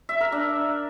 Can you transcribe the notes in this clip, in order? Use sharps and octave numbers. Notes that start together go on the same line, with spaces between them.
E5
A#4
D4